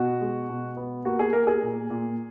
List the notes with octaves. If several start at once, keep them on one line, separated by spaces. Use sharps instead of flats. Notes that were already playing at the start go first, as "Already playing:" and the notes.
Already playing: B2 F#4
G#3
B2
B3
A#3 F#4
G#4
A#3 A#4
G#4
A#2
A#2